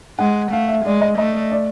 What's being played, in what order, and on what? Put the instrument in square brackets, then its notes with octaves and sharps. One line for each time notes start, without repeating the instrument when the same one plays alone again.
[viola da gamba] G#3 [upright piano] F#5
[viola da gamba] A3 [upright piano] F5
[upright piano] E5
[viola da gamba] G#3 [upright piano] D5
[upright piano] D#5
[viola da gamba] A3 [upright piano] D#5
[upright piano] D5